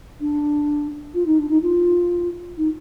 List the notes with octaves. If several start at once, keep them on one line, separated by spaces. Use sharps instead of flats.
D4
F4
D#4
D4
D#4
F4
D#4